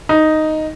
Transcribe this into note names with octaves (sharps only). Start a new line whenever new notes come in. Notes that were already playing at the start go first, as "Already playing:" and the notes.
D#4